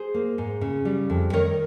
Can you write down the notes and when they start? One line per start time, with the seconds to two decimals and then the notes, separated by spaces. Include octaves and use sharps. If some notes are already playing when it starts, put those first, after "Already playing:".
Already playing: G#4 C5
0.14 A#3
0.38 G#2
0.61 C#3
0.85 G3
1.10 F2
1.33 D#3 A#4 C#5